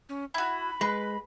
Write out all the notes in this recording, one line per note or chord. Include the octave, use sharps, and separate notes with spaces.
C#4
E4 F#4 B5
G#3 B4